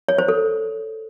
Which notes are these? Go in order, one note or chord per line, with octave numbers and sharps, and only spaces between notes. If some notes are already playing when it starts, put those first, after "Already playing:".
C#5
C5
A4